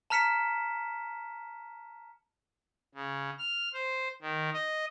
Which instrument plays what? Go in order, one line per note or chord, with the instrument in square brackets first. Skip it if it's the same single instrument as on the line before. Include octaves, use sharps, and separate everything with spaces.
[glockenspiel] A5 A#5 F6 B6 C#7 E7
[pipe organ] C#3
F6
C5
D#3
D#5